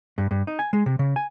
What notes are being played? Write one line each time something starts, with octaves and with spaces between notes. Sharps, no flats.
G2
G2
D#4
G#5
G#3
C3
C#3
G#5